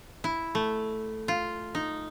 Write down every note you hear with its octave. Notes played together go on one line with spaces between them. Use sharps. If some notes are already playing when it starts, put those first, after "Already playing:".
E4
A3
F4
D#4